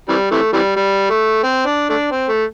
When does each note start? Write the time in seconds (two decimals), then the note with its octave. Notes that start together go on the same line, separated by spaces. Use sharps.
0.09 C3 E3 G3
0.31 C3 E3 A3
0.53 C3 E3 G3
0.76 G3
1.10 A3
1.44 C4
1.66 D4
1.90 A3 D4
2.12 C4
2.29 A3